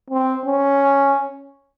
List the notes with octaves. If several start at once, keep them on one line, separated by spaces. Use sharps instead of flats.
C4
C#4